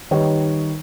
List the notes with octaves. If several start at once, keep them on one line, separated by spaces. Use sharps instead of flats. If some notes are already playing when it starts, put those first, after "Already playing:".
D#3 G3 D#4 B4 C#5